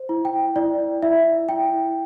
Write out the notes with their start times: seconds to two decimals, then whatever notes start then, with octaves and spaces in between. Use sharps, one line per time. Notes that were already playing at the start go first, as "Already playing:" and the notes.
Already playing: C5
0.09 E4
0.25 G5
0.56 E4 D5
1.02 E4 E5
1.49 E4 G5